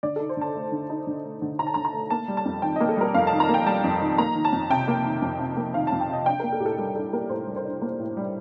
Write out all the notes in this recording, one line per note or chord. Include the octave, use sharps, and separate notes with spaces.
D3 D5
D#4 A4
C5
D3 A5
A3
D3
D#4
D3
A3
D3
D#4 A#5
A5
D3 A#5
A#5
A3
A#3 A5
G3
A5
F2
D#3 G5
A#3 D#5
A4
G3 A#4
F2 F5
A5
D#3
A#5
A#3
G5
G3 A5
F2
D#3
A#3 A#5
D#3
A5
F2
C3 G5
A#3
D#3
F2
C3
A#3
D#3 F5
F2 A5
G5
C3 D#5
D4 G5
A#3 A#4
A4
A2 G4
A4
G3 A4
D4 A4
A#3 A#4
A2 C5
G3
C5
D4
A#3
A2
G3